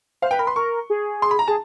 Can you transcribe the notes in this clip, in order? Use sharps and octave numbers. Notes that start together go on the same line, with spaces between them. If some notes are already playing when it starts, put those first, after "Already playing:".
C5 F5
B4 G5
A#4 B5
B4 C6
A#4 C#6
G#4
C6
B5
A#5
G#4 A5